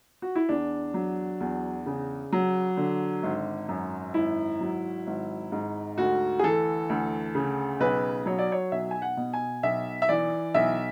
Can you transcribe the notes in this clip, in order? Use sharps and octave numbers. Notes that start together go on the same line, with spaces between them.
F#4
E4
E2 D4
F#3
E2
C#3
F#3
D3
G#1
F#2
G#1 E4
F#3
G#1
G#2
D2 F#4
G#4
E3 A4
D2
C#3
B1 B4
F#3 C#5
D5
C#5
B1 E5
G#5
F#5
B2
G#5
B1 E5
E5
E3 D5
B1 E5